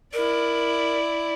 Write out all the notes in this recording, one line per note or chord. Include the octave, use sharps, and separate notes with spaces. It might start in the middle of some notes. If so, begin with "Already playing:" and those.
E4 A#4 D5